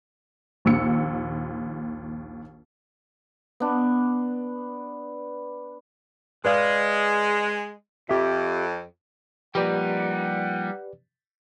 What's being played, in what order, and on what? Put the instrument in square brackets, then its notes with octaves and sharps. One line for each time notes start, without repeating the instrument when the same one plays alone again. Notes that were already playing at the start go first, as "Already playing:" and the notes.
[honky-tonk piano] A#1 D#2 E6 C#7
[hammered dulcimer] B3 D4
[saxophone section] G#3 [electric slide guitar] B4 D5 F5
[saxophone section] F2 [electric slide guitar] G4 E5
[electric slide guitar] F3 A#3 [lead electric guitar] G3 D#4 [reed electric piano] G4 B4 D5 [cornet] F#5